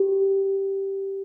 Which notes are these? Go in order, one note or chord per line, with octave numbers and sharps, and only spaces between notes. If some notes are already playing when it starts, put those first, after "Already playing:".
Already playing: G4